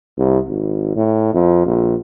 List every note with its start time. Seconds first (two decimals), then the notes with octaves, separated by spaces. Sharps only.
0.18 C2
0.49 G#1
0.96 A2
1.34 F2
1.66 A#1